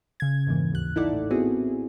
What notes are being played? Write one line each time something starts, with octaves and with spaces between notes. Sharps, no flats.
C#3 G#6
F2 G#2 E3 A#3
A1 D#2 F#6
D#4 E4 A4 D5 F#5
A2
B3 C4 E4 F#4 G#4